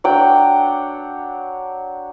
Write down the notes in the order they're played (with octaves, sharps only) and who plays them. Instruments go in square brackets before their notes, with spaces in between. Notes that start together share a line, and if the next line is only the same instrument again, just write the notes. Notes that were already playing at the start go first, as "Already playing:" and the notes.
[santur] F#3 D4 F#5 G5